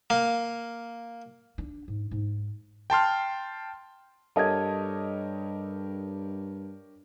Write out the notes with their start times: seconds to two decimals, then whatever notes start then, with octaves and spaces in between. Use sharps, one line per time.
0.10 A#3
1.58 D4
1.88 G#2
2.11 G#2
2.90 G5 A5 C6 F6
4.36 G2 G4 A4 A#4 C#5 D#5 A5 G#6